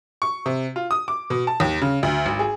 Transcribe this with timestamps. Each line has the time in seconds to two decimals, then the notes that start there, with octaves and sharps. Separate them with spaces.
0.22 C#6
0.46 C3
0.76 F4
0.91 D#6
1.08 D6
1.30 B2
1.47 A5
1.60 D#2
1.82 C#3
2.03 D2
2.26 G#1
2.39 G#4